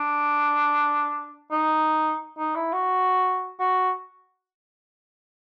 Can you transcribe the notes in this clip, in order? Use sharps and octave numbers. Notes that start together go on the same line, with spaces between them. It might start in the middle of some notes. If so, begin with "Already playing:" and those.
Already playing: D4
D#4
D#4
E4
F#4
F#4